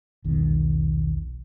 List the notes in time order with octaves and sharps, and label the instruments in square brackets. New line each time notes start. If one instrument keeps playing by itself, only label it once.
[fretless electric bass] E1 B1 D#3